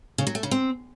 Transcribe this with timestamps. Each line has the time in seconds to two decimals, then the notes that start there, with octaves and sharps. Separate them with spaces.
0.18 C#3
0.27 F#3
0.35 A3
0.43 C#3
0.51 C4